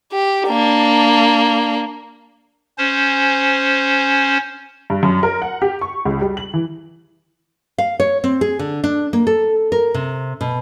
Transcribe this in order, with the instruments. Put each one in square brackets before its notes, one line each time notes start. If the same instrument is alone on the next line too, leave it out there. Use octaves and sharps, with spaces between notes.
[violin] G4
A#3 D4
[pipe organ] C#4 C5
[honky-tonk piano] G2
F#2
A#4
F#5
G4
C#6
C#2
G3
F#7
E3
[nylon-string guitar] F5
C#5
C4
G#4
D3
D4
A#3
A4
A#4
C3
B2